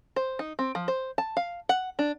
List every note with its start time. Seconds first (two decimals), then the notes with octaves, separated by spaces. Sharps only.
0.16 C5
0.39 D#4
0.59 C4
0.75 F3
0.88 C5
1.18 A5
1.37 F5
1.69 F#5
1.99 D4